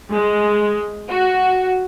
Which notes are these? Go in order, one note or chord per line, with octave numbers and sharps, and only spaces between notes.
G#3
F#4